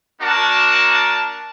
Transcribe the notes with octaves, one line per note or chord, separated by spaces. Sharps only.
A#3 D4 F#4 A#4 A5